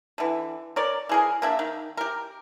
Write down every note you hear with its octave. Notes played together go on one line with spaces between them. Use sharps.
D3 E3
A#4 C#5 D5
E3 G#4 A#4
A#3 D4 E5
D#3
G4 A#4